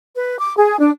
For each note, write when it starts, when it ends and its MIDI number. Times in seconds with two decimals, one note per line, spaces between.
0.15 0.38 71
0.39 0.55 86
0.57 0.78 68
0.79 0.90 62